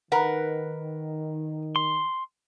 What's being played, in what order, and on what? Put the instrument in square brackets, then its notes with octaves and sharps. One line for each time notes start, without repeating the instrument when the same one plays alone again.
[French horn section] D#3 [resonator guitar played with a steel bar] A#4 B4 F#5
[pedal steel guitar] C6